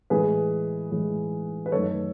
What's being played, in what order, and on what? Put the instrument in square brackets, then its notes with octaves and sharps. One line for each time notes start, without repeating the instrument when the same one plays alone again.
[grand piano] A2 E3 G#3 G#4 B4
A2 E3 G#3
B4
F#2 D#3 A3 A4 C#5